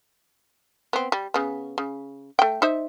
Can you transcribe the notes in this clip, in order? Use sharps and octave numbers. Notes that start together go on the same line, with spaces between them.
B3 C4
G3
C#3 B3
C#3
A3 G5
D#4 C5 E5